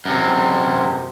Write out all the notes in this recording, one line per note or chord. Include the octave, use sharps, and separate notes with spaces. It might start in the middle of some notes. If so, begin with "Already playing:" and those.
F#2 C3